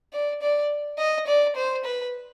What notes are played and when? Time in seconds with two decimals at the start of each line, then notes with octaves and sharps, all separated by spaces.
0.13 D5
0.42 D5
0.98 D#5
1.27 D5
1.56 C5
1.84 B4